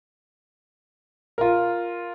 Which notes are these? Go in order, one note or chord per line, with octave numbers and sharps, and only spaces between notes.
F4 A#4